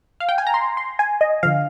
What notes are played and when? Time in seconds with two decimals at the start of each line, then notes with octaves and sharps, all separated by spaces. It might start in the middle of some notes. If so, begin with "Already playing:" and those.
0.20 F5
0.29 G5
0.38 G#5
0.47 A#5
0.54 C6
0.77 C6
0.99 G#5
1.21 D#5
1.43 D3 F3 F5